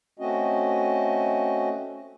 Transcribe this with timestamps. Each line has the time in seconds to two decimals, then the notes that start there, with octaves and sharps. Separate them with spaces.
0.19 A3 C4 C#4 F#4 D#5